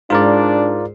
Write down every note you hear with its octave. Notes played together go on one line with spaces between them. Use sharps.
G#2 D4 F4 A#4 D5